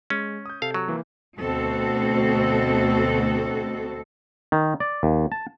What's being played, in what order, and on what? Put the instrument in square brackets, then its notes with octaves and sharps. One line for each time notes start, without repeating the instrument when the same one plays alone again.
[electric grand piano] G#3 [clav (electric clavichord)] C#4
[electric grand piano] D#6 G6
[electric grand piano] C3 A4 [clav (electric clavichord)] F5
[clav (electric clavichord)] F#3
[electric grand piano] E3 A#3
[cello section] D2 B2 C4 F#4 A4
[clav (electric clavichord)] D#3
D5
D#2
A5